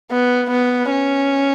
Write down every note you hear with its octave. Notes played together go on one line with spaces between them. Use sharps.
B3
B3
C#4